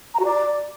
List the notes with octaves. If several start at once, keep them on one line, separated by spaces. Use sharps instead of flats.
A#5
F#4
D5